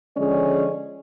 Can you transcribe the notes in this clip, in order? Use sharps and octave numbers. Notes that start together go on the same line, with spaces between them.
D3 F3 G#3 C#4 G#4 D5